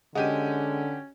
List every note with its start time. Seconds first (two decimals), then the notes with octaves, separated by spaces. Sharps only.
0.15 D3 G#3 C#4 F#4 G4 D#7